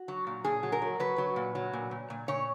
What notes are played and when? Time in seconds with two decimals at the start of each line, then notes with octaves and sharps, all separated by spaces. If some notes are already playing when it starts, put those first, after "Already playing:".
Already playing: F#4
0.08 F#3
0.27 A#2
0.44 A#2 G#4
0.63 F#3
0.72 A#4
0.82 F#3
1.00 F#3 B4
1.18 F#3
1.36 A#2
1.55 F#3
1.73 A#2
1.91 A#2
2.10 A#2
2.28 A#2 C#5